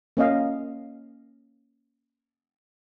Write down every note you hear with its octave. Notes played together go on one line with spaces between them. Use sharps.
A#3 C#4 D#5 F5